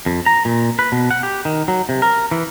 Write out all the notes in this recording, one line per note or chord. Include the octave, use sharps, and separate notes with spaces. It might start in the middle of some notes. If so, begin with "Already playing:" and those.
F2
A#5
A#2
B4
B2
F#5
G4
D#3
F#3
C3
A#4
E3